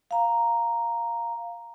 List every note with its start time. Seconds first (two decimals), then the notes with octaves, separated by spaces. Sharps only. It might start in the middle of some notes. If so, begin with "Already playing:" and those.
0.11 F5 A#5